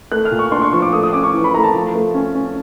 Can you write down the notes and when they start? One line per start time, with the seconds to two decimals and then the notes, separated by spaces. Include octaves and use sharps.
0.11 A3 F#6
0.25 F6
0.31 A#2
0.39 C#6
0.52 D4 C6
0.62 C#6
0.73 F3 C#6
0.82 D6
0.93 A3 D#6
1.03 D#6
1.13 C#4 D6
1.23 C#6
1.34 E3
1.44 B5
1.54 A3 A#5
1.64 A5
1.74 F3
1.95 A3
2.14 C#4
2.35 C#4